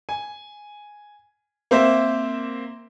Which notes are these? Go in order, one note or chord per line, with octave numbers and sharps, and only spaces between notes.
G#5
A#3 C4 C5 E5